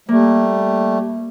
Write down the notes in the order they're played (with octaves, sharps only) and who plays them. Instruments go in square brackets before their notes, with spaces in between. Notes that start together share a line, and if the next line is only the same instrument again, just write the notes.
[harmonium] G3 A3 [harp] A#3